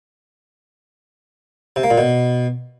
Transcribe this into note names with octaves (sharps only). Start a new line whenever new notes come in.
C3
A#3
A#2
B2